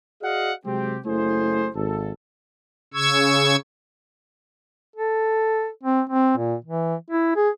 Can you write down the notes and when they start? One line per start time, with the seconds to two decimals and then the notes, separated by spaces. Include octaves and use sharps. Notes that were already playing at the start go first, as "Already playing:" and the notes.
0.22 F#4 G#4 D5 D#5 F5 F#5
0.65 C3 F#3 G#3 C4 G4
1.06 F#1 A3 E4 G#4 C5
1.75 G#1 A4
2.94 C#3 C#6 E6 G#6
4.96 A4
5.83 C4
6.10 C4
6.37 A#2
6.65 E3
7.10 E4
7.36 G#4